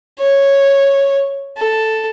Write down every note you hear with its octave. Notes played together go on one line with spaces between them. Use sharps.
C#5
A4